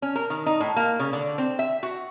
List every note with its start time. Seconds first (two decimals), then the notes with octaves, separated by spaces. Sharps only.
0.02 C#4
0.15 A#4
0.30 D#3
0.46 D#4
0.60 A2
0.76 A#3
0.99 C#3
1.13 D3
1.38 C4
1.59 E5
1.83 F#4